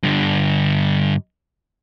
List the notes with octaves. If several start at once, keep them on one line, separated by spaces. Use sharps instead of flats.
G2 D3